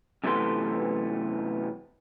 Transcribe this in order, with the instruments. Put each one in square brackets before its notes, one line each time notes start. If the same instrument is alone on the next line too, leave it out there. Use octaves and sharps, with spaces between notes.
[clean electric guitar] F#2 C3 E3 A3 B3 C6